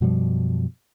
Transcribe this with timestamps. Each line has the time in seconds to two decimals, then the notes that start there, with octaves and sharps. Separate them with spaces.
0.01 F#2 B2 F3 G3